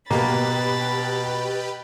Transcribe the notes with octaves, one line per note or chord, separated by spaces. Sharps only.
B2 A#3 G4 B4 B5 A6